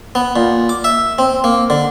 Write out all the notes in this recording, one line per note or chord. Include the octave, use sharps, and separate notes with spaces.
B3
A#2
D6
E5
C4
A#3
D3